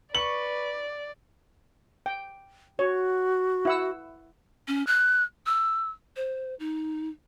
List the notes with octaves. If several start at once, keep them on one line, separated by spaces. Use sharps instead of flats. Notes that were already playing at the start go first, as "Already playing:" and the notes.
B4 D5 C#6 F#7
G5
F#4 C#5
E4 F#5 E6
C#4
F#6
E6
C5
D#4